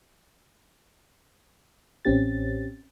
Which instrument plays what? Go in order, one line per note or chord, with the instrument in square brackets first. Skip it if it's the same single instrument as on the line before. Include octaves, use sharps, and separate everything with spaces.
[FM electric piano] A1 C4 C#4 G4 A6